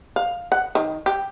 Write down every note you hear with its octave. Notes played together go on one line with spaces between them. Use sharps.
F5
F#5
D#3
G4